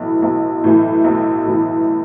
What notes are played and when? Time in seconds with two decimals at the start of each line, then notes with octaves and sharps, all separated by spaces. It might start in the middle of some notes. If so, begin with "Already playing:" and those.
Already playing: B1 A2 E3
0.22 B1
0.64 A2 E3
1.04 B1
1.45 A2 E3